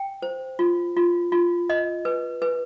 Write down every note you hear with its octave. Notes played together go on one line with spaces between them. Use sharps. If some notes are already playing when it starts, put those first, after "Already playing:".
Already playing: G5
C5
F4
F4
F4
D#5
B4
B4